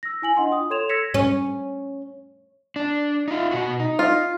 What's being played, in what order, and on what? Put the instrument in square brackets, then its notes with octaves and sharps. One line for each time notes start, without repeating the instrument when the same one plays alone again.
[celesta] E6 A#6
E4 G#5 F#7
D4 D#5 F#5 C6
F4 G5 D#6
A4 C#5 C6 G#6 E7 F7
E6 G#6 A#6 B6 C#7 E7
[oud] C#4
[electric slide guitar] D4
D#4 F4
B2 F#4
D#4
[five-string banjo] F4